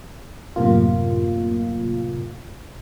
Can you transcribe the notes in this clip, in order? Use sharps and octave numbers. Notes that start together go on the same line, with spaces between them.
F#2 A2 C3 A#3 F4